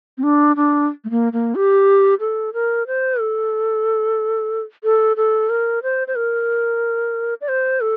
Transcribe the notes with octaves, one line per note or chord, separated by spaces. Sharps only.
C4
D4
D4
A3
A#3
A#3
G4
A4
A#4
C5
A4
A4
A4
A#4
C5
C5
A#4
D5
C5
A4